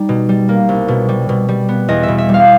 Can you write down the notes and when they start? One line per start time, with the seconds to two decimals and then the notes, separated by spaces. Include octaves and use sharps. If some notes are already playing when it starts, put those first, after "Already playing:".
Already playing: G3 D#4
0.09 B2
0.29 G3
0.49 A#3
0.69 C2
0.88 B2
1.09 G3
1.29 B2
1.48 G3
1.69 B3
1.88 E2 D#5
2.03 B2 E5
2.18 E5
2.29 G3
2.34 F5